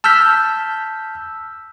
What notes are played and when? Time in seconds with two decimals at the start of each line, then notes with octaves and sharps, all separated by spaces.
0.04 A5 E6 F6 G6 B6